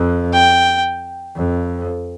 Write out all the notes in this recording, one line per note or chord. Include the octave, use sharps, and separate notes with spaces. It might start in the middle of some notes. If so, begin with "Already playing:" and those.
Already playing: F2
G5
F2